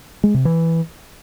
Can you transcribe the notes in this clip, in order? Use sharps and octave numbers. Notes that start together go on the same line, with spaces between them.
G#3
C3
E3